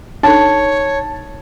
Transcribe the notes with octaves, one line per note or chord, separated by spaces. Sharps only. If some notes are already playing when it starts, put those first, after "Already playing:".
D4 D#4 A4 C#5 A5